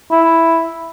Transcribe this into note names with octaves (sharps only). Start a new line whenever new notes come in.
E4